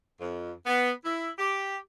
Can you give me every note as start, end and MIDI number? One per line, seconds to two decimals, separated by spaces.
0.20 0.52 41
0.66 0.90 59
1.05 1.31 64
1.38 1.77 67